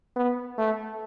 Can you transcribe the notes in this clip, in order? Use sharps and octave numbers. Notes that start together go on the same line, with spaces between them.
B3
A3